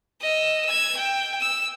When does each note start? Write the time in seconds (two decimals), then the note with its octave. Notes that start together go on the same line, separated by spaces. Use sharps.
0.22 D#5 E6
0.66 E6 G#6
0.97 G5
1.41 E6